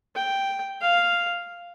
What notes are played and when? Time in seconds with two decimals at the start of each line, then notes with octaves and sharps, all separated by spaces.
0.16 G5
0.82 F5